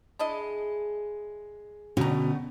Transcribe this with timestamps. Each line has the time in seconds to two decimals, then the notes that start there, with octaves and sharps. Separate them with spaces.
0.19 G#3 D4 E4 D#5
1.97 F#2 B2 D3 F#3 A3 C#4 G4 A#5